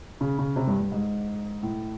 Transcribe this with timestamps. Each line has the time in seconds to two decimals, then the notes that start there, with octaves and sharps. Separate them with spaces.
0.21 C#3
0.39 C#3
0.56 C3
0.67 G2
0.80 G2
0.92 G#2
1.63 A2